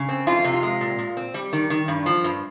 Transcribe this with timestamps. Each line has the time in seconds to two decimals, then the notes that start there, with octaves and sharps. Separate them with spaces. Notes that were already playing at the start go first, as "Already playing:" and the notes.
Already playing: C#3
0.09 C4
0.27 F2 F4
0.44 C3
0.53 F4
0.63 G#3
0.81 A#2
0.99 A#2
1.17 C4
1.34 G3
1.53 D#3
1.70 D#3
1.88 G2
2.06 F3
2.24 G2